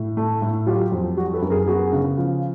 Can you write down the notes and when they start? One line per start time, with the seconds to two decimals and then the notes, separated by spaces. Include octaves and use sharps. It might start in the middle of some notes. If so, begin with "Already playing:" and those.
Already playing: A2
0.17 A3
0.42 A2
0.67 F#3 F4 G4
0.92 F2
1.17 G3 F#4
1.34 A4 B4
1.42 F#2
1.50 G#4 A#4
1.67 B3 F#4 G#4
1.93 C#3
2.18 F3